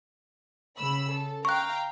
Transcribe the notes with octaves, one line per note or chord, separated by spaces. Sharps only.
C#3 B5 E6
A4
F5 G5 A#5 C#6 F#6